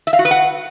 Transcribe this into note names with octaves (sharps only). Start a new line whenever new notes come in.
E5
F5
F#4
B4
F#5